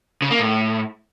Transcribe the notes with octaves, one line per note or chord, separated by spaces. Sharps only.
C#3
A#3
A2